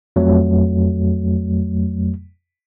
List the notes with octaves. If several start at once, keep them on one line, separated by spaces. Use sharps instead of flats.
F2 F#3 A3